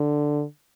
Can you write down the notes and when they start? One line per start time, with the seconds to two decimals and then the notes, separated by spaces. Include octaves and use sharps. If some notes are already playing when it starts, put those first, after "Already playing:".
Already playing: D3